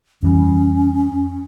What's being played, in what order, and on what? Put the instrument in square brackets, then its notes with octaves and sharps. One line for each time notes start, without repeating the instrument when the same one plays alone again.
[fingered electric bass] F2 E3 G3 [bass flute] C#4